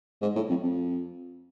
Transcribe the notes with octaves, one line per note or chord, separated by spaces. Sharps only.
G#2
A2
F2
F2